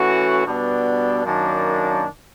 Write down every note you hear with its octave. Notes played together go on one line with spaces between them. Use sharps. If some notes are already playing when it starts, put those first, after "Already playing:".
Already playing: E3 A3 C#4 F#4
B2 G3 B3 D4
F#2 D#3 F#3 A#3 D4